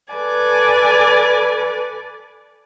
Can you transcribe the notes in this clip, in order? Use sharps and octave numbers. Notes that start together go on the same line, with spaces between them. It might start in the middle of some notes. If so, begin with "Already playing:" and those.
A4 B4 D5 G#5